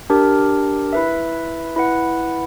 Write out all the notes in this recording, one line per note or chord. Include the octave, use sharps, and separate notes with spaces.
D4 G4 A#4
E4 B4 E5
E4 B4 F#5